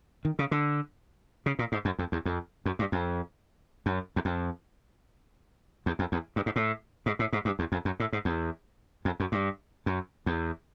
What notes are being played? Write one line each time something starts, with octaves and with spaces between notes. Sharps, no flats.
D#3
C#3
D3
C#3
A#2
G#2
F#2
F2
E2
F2
F#2
G2
F2
F#2
E2
F2
E2
F2
E2
G2
G#2
A2
G#2
A2
G#2
G2
E2
F2
F#2
A2
G#2
E2
F2
F#2
G2
F#2
E2